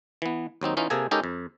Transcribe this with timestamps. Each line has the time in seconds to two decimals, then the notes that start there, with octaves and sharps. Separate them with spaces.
0.22 E3 B3
0.61 D#2 F#3 C4 D#4
0.77 E3 C#4 D#4 F4
0.90 C3 A#3 G#4 A4 G#5
1.11 G#3 C#4 D#4 G4 A4 A#4
1.24 F2